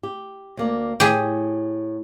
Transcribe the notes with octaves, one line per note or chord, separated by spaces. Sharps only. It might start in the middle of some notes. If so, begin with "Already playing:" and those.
G4
D2 A#3 D5
A2 G4 G#4